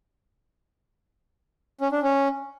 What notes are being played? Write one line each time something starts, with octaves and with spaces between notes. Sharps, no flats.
C#4
D4
C#4